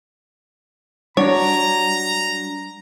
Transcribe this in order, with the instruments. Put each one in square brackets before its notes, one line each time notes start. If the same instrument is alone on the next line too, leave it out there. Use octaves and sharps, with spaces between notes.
[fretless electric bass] G3 [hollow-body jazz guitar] D4 F#4 [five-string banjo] C#5 [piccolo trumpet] A#5